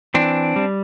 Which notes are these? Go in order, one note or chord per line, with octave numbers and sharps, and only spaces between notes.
E3 C4 D4
G3